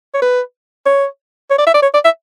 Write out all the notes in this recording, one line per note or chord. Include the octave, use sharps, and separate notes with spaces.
C#5
B4
C#5
C#5
D5
E5
D5
C#5
D5
E5